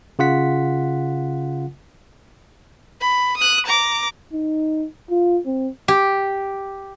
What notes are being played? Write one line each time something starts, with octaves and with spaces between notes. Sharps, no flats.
C#3 F4 F#5 B6
B5
D#6 F#6
A#5 D6
D#4
F4
C4
G4